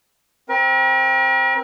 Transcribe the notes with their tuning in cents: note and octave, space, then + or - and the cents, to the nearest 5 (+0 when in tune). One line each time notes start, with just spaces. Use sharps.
C4 +10 A#4 +45